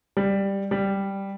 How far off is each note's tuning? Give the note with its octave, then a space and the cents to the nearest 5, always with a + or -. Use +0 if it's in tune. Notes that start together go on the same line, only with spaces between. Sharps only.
G3 +5
G3 +0